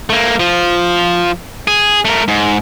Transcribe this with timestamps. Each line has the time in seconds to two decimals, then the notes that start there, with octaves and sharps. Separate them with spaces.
0.10 A3 A#3
0.39 F3
1.67 G#4
2.05 A3 A#4
2.28 G#2